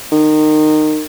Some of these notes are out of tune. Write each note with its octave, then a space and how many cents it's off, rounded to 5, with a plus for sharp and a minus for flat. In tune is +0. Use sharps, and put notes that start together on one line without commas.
D#3 -20